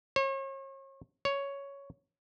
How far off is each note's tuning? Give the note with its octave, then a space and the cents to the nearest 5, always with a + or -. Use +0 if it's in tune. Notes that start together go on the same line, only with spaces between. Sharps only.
C#5 -40
C#5 +5